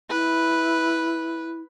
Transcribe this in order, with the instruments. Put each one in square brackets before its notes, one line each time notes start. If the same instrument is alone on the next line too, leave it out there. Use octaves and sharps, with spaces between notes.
[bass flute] E4 [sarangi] B4